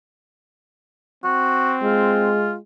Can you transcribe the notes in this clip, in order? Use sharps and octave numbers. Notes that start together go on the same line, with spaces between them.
C4 F#4
G#3 F4